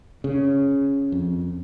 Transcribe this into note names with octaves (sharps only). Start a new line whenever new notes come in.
C#3
F2